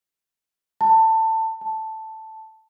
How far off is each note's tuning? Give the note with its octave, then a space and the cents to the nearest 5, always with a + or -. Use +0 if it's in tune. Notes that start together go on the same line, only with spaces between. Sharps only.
A5 +20
A5 +0